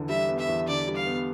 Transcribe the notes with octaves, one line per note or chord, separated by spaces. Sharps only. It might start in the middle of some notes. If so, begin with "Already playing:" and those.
Already playing: E2 D3 B3
G3 E5
B3
E5
E2
D3 D5
G3
F5
B3